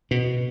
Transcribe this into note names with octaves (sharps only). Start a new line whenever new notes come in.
B2